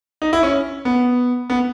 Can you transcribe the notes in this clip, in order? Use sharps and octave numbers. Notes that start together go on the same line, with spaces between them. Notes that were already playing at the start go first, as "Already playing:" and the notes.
D#4
E4
C#4
B3
B3